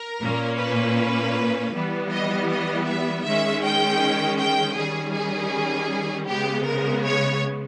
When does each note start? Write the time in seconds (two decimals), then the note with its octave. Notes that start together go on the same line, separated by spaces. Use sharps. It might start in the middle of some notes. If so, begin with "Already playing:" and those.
Already playing: A#4
0.21 A#2 A#3 C#4
0.59 B4
1.72 E3 G3 B3
2.11 D#5
2.49 D#5
2.87 E5
3.25 D#3 G#3 C#4 E5
3.63 G5
4.39 G5
4.77 D#3 G3 C#4 G#4
5.15 G#4
6.28 C#3 G#3 B3 G4
6.66 A#4
7.05 C#5